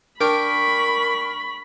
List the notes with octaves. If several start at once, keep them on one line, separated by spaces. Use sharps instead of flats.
D4 A#4 G5 B5 C#6